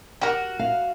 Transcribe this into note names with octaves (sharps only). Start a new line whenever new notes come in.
F#4 G4 A#4
F5